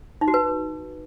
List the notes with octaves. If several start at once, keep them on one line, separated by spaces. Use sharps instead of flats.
D#4
F#4
B4